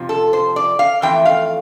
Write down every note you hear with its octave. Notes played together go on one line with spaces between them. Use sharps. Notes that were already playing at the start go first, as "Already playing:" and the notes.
Already playing: F2 C3 F3
A4
C5
D5
F5
F2 E3 A3 G5
F5